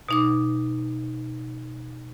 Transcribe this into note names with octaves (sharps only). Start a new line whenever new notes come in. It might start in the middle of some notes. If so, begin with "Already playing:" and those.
B2 D#4 D6